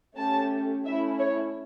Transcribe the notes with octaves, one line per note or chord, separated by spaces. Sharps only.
A3 C#4 G4 A5
A3 C#4 E4 E5
C#5